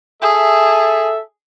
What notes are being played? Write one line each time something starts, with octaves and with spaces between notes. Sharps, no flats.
G#4 A4 E5